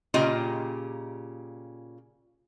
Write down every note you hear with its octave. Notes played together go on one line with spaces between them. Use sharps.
A#2 C#3 F4 G4 D#5 A#5